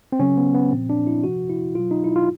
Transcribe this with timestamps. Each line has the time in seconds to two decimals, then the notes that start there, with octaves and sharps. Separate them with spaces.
0.12 C4
0.20 C#3 F#3 C#4
0.37 B3
0.54 B3
0.71 A#2 F3 C4
0.90 D4
1.07 E4
1.24 C3 F3 F#4
1.50 E4
1.75 B2 F#3 F4
1.91 D#4
2.04 E4
2.16 F4